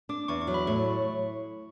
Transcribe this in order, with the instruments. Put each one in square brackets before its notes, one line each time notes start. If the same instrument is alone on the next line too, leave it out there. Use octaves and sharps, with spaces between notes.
[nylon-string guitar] D4 [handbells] D6
[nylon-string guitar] E2 [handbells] C#6
[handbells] C#6
[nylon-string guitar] F#3
[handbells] B5
[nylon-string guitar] A2 [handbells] C#6